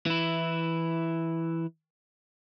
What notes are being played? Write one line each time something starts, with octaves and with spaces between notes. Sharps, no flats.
E3 E4